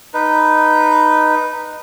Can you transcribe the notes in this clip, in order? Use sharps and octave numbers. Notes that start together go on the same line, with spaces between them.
D#4 B4